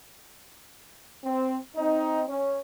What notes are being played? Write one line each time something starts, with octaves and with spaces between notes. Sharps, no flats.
C4
C4 D#4
C#4